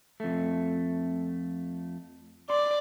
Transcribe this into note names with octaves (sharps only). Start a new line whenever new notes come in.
F2 A3
D5 C6